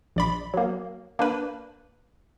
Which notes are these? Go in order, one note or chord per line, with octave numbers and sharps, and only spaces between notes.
A#1 D5 B5
F#3 A#3
A#3 D4 B4